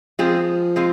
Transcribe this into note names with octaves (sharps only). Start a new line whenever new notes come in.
F3 G#3 C4 F4 G#4
G#3 C4 F4